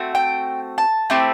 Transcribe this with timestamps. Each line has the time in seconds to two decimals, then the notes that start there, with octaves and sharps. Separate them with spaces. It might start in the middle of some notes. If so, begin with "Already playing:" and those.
Already playing: A3 C4 F#4
0.15 G5
0.78 A5
1.10 A3 C4 E4 G4